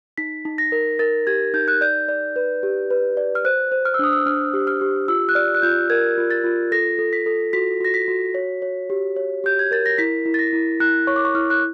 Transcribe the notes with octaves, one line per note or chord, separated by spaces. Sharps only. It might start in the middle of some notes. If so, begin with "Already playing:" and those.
D#4 B6
D#4
A#6
A#4
A#4 A6
G4 G#6
D#4 G6
F#6
D5 G6
D5
B4
G4
B4
D5
F6
C5 F#6
C5
F6
E6
D4 D#6
E6
D4 F6
G4
F6
G4
F4 E6
F#6
D5 F6
F#6
F4 G6
A#4 G#6
F4
A6
F4
A4 A#6
A4
B6
A4
F#4 B6
F#4 A#6
B6
F#4
C#5
C#5
G4
C#5
G4 G6
G#6
A#4 A6
A#6
E4 B6
E4
A6
A#6
E4
E4 F#6
C#5 C#6
D6
C#6
E4 F6
F#6